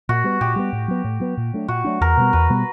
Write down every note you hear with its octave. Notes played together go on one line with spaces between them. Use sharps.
A#2 F#4
G3 B3
A#2 G4
G3 B3
A2
F#3 B3
A2
F#3 B3
A#2
F#3 A3 D4
A#2 F#4
F#3 A3 D4
E2 A#4
B2 G3 B3
E2 B4
B2 G3 B3